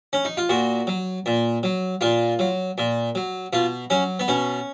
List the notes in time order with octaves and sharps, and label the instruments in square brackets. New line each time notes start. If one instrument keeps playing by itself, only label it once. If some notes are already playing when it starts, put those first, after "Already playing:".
[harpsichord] C#4
D#4
F4
A#2 F#4
F#3
A#2
F#3
A#2 F4
F#3
A#2
F#3
B2 F4
F#3 C#4
B3
B2 C#4